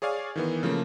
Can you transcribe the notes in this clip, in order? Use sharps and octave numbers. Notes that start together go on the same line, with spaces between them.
G#4 C#5 D5 F5 G#5
D#3 E3 B3
C#3 F3 A3 A#3